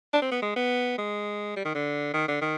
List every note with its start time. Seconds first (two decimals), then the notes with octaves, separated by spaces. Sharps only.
0.14 D4
0.22 C4
0.32 B3
0.42 G#3
0.56 B3
0.99 G#3
1.57 G3
1.65 D#3
1.75 D3
2.14 D#3
2.28 D3
2.42 D#3